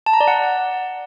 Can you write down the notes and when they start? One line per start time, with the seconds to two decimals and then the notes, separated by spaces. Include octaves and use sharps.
0.06 A5
0.13 A#5
0.21 D5
0.28 F#5